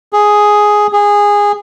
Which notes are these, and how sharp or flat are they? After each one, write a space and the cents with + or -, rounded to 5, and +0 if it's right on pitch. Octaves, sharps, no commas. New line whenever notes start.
G#4 +5
G#4 -15